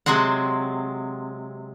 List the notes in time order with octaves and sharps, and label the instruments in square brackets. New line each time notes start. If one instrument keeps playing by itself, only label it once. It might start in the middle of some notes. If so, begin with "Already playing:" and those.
[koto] C3 F#3 G#3 C4 F#5